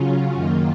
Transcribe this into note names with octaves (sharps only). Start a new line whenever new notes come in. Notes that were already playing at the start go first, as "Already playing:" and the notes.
Already playing: C#3 F#3 C#4 F4
F#2 D#3 A#3 F4